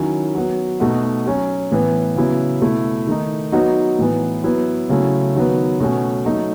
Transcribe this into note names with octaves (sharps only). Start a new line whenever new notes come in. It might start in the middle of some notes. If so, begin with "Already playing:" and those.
Already playing: D#3 F#3 C#4 E4
F#3 B3 F#4
B2 A3 D#4 F#4
F#3 C#4 F#4
A2 E3 B3
C#3 F#3 B3 E4
B2 A3 E4
D#3 A3 D#4
F#3 B3 D#4 F#4
A2 E3 B3
F#3 B3 E4
C#3 F#3 A3 E4
D#3 F#3 B3
B2 A3 C#4 F#4
F#3 A3 D#4